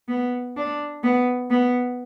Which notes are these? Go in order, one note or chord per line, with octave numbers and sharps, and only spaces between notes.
B3
D4
B3
B3